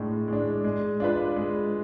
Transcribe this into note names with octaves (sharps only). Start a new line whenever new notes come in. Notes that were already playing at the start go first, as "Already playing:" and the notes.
Already playing: A2 G#3 D4
G#3 D4
G#3
D4 F4 B4
G#3